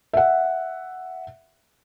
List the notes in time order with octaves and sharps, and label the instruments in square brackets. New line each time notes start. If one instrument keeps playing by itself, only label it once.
[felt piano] E5 F#5